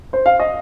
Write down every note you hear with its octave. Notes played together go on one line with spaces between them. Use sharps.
C5
F5
D#5